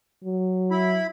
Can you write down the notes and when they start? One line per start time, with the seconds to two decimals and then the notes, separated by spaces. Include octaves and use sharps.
0.24 F#3
0.71 E4 B5